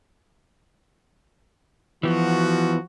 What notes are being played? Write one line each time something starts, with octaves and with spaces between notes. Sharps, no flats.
E3 F3 B3 F#4